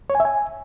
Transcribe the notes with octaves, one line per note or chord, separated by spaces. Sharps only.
C#5
G#5
E5
G#5